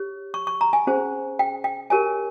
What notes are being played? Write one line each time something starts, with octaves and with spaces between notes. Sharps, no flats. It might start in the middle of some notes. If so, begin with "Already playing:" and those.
Already playing: G4 C#5
C#6
C#6
A#5
G#5
C#4 G#4 C5
G5
G5
G4 A#4 C#5 G#5